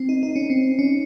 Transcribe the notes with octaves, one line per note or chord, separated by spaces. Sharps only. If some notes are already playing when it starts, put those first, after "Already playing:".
Already playing: C4
D#4
D#4
C#4
C4
C#4